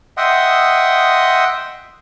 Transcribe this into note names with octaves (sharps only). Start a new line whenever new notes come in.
D#5 E5 F#5 G5 C6 D#6